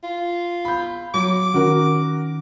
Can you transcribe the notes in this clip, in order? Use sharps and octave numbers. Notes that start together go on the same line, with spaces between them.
F4
B5 G6
F#3 D6
D#3 C#4 F#4 A#4